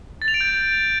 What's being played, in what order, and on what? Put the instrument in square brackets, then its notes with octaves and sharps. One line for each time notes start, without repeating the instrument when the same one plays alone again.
[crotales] A6
F7
D7
G6